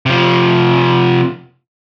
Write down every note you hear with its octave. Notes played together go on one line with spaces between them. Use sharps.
C3 F3